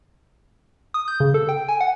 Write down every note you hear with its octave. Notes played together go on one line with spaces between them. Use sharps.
D#6
G6
C#3
A4
G5
G#5
F#5